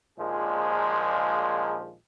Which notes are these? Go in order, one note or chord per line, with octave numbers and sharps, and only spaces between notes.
A#1 D#2 A#2 F3 G#3 G#4